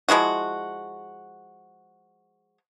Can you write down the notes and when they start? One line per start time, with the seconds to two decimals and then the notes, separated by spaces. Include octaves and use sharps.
0.08 F3 G#3 E4 F#4